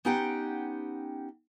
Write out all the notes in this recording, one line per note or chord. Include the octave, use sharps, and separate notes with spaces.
B3 C#4 D#4 G4 F#5 G5